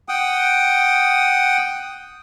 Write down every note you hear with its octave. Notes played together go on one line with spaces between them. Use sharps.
F#5 G5 D#6